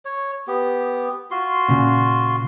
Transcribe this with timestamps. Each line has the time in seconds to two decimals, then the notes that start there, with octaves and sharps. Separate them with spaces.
0.05 C#5
0.48 B3 G4
1.31 F4 F#4 C6
1.69 A#2 C#3